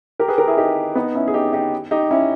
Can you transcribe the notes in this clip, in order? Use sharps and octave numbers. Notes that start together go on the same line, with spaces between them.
G4 A#4
G#4 B4
G4 A#4
E4 G#4
D#4 G4
B3 D#4
C#4 E4
G#4
D#4 G4
D#4 G4
D#4 G4
C#4 E4